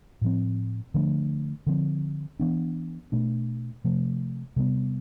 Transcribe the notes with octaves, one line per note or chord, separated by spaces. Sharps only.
A2 F3 C4
D3 F3 A3 D4
D3 F3 C4
E3 B3 D4
B2 A3 D4
C3 F3 A3
C3 G3 B3